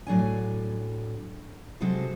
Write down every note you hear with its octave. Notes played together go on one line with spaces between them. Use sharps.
A2 F#3 D4 G#5
C3 F#3 G#3 F#4 A4 C5